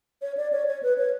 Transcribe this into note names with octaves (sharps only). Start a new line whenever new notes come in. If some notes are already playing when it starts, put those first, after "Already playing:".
C#5
D5
C#5
C#5
B4
C#5